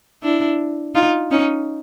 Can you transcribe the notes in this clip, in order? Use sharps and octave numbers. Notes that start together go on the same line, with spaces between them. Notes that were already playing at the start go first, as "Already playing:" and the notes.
D4 E4
D#4 F4
C#4 D#4